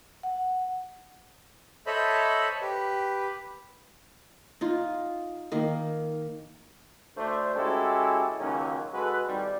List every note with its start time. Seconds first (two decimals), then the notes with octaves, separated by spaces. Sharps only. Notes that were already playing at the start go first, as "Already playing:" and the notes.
0.23 F#5
1.87 A4 C5 C#5 D#5 E5 B5
2.62 G4 B4
4.61 D#4 F4
5.52 D#3 A#3
7.16 D2 A3 D4 C5
7.55 G#3 C#4 E4 F#4 G4 A4
8.39 C#2 D#3 F#3 A#3 C#4
8.93 G#3 F#4 A4 B4
9.27 G#1 G3